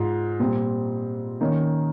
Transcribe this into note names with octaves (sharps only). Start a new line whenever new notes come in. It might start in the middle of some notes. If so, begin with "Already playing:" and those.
Already playing: G#2 F4
A#2 G3 C4
D#3 A#3 C#4